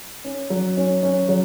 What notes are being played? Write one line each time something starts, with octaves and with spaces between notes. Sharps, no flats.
C#4
F#3
C#4
C#4
F#3